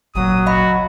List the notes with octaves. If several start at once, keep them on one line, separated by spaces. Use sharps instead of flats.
G#1 C#2 A#2 F#3 D#6
F#4 D#5 F5 B5